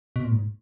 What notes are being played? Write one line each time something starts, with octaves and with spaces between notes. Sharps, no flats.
B2
A#2
G#2